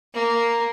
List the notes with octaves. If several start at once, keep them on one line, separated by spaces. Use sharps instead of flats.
A#3